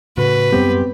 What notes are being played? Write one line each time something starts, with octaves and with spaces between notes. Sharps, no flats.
A2 C#3 A3 F#4 B4
F#2 G3 B3 C4 G4